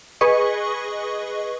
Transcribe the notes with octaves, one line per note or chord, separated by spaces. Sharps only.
G#4 B4 D#5 C#6